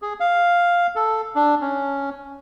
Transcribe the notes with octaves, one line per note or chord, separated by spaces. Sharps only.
G#4
F5
A4
D4
C#4